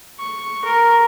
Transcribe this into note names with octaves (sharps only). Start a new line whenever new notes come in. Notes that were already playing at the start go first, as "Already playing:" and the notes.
C#6
A#4